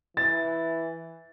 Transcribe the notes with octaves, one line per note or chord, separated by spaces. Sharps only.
E3 A6